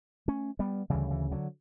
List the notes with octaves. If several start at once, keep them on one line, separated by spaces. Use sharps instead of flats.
A3 C#4
G3 B3
D2 C#3 E3 G3
E3
D3 F#3